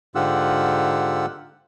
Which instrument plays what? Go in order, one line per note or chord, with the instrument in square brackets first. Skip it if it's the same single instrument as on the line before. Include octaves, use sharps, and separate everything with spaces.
[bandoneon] G#2 D3 F4 G4 F#5 E6